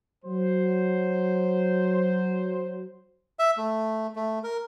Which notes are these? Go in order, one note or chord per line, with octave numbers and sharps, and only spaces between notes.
F#3 C5
E5
A3
A3
A#4